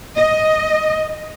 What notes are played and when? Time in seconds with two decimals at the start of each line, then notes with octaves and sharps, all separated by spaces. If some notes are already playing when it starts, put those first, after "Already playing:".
0.17 D#5